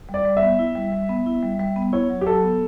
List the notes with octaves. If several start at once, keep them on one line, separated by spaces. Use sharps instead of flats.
G3
D5
G3
E5
B3
E4
G3
G3
B3
E4
G3
G3
B3
E4 C#5
F#3
G4
F#3 A4
B3